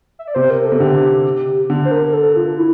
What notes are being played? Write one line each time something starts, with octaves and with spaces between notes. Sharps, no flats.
E5
D5
C3 C5
A#4
A4
C3
D3 G4
D3
C5
A#4
A#4
A4
F4
E4